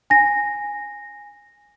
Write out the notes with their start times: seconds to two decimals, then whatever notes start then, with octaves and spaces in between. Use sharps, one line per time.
0.10 G#5 A#6